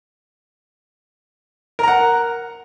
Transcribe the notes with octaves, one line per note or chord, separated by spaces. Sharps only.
A#4 F#5 A#5